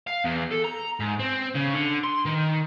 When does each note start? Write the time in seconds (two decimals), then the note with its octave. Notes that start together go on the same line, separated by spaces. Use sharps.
0.07 F5
0.24 E2
0.51 A4
0.64 A#5
1.00 G#2
1.20 C4
1.55 C#3
1.73 D3
2.04 C6
2.26 D#3